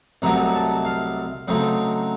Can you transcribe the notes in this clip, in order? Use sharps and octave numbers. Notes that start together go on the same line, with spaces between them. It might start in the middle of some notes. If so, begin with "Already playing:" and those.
C2 C3 F#3 A3 D#4 A#5
A5
F5
C#3 F#3 A3 C4 D#4